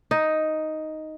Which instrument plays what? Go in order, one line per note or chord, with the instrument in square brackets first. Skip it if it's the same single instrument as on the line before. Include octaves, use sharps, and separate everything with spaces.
[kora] D#4